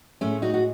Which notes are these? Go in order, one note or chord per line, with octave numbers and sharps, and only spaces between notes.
A2 G#3 A3 C#4
D#4 F#4
F#4